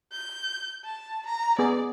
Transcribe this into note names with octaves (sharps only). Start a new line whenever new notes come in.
G6
A5
A#5
B3 G#4 D5